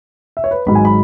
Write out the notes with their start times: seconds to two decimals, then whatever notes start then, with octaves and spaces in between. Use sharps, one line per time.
0.37 E5
0.44 C#5
0.51 B4
0.66 G#1 G#2 F#3 B5
0.75 G#5
0.85 B5